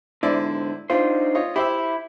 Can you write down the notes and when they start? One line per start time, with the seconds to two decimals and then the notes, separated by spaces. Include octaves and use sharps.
0.23 G#2 D3 E4 C5 D5
0.90 D4 D#4 F4 C5
1.35 F4 C#5 D#5
1.56 E4 G4 C5 E5